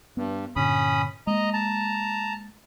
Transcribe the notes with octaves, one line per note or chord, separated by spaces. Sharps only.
G2 B3
G2 A#2 D3 C#4 B5 D#6
G#3 A#3 D#5 A#5
A5 A#5